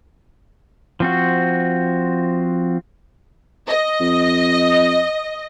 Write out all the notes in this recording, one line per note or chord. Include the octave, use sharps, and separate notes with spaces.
F3 C4 F#4
D#5
F2